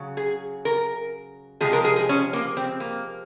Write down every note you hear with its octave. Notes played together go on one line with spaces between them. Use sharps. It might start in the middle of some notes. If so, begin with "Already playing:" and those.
Already playing: C#3 F#3
G#4
A#4
C3 F3 G#3 G#4
A#4
G#4
G#4
C#4
A#3
C4
A#3